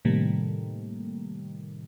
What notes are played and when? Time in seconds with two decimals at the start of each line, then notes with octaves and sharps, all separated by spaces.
0.05 A2 C3 D#3 G3 A3 A#3